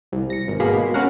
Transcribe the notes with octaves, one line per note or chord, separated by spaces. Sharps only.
C2
A#6 C#7
G#1
B2 G#3 A#3 B5 C7
C#4 F#4 A#4 F5 F#5